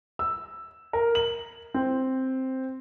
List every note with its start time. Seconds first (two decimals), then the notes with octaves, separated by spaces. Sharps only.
0.19 E6
0.93 A#4
1.15 F#7
1.74 C4